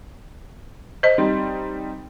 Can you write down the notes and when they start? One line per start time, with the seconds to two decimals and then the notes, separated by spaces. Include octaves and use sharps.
1.03 C5 D#5
1.18 G3 C4 D#4